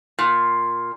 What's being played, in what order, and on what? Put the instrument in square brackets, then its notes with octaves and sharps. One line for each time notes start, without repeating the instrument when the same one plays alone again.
[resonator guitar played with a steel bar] A#2